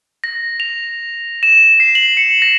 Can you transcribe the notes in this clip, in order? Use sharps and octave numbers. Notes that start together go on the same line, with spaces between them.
A#6
F7
E7
C7
F#7
C#7
A#6